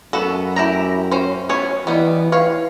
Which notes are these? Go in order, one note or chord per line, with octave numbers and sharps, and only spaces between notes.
F#2 B3 F#4 A4
E4 G4 A#5
C#4 C5
B3 C#4 C#5
E3 G3 B3 D#4
B4 C#5 F5